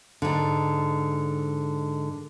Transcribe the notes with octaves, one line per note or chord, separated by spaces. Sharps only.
G#2 D3